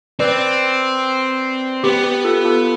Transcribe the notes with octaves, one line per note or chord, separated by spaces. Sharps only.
C4 B4 D5
B3 G4 B4
G4 B4
F4 A4
F4 A4